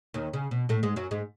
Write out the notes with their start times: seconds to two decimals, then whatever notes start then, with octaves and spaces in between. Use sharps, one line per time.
0.14 D#2 D#3
0.33 C#3
0.51 B2
0.69 A2 A3
0.83 G#2 G#3
0.96 F#2 F#3
1.11 G#2 G#3